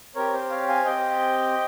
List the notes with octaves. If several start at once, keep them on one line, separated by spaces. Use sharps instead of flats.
C4 G4 A#4 C#5
C5
C#5 F5
F5 G#5
C4 G4 D#5 G5